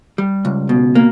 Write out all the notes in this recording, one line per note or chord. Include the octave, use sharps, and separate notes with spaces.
G3
C#2
B2
A#3